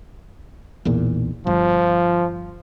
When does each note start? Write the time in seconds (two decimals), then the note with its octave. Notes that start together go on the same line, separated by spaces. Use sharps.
0.85 B1 E2 A#2
1.47 G1 F3